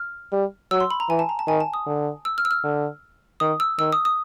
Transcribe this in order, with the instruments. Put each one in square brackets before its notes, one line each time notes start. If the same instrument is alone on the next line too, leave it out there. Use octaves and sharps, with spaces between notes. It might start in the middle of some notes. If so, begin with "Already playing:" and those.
Already playing: [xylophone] F6
[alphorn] G3
[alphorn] F#3 [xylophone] E6
[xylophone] C6
B5
A#5
[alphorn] E3 [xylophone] G#5
[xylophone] A5
A#5
A5
[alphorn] D#3 [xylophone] G#5
[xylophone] A5
D#6
[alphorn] D3
[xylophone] E6
F6
E6
F6
[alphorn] D3
[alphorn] D#3 [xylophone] D#6
[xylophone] E6
[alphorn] D#3 [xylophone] E6
[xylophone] D#6
D#6